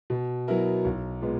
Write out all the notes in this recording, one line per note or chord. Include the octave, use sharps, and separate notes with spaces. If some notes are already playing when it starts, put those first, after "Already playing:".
B2
F#3 B3 E4 A#4
B1
A#2 G#3 B3